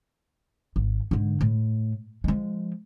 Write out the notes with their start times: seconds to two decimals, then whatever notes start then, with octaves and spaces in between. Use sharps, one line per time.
0.76 G#1
1.11 G#2 D3
1.41 A2
2.24 F3 G#3